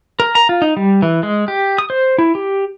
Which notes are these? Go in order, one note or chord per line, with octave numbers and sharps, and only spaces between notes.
A#4
A#5
F4
D#4
G3
E3
G#3
G4
D#6
C5
E4
G4